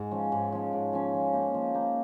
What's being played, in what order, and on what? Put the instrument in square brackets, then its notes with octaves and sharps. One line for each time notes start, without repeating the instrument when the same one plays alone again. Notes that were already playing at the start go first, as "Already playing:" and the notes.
Already playing: [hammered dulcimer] G#2
F3 C#4
G#2
F3 C#4
G#2
F3 C#4
F3
A#3 D#4
F3
A#3 D#4